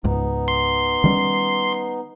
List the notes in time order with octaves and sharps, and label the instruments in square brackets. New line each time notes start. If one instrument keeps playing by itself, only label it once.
[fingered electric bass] C#2 G#2 [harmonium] B3 D#4
[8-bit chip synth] C6
[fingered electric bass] D#3 G3 C#4